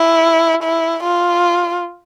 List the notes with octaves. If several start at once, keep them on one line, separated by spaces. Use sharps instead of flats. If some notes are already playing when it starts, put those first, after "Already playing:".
Already playing: E4
E4
F4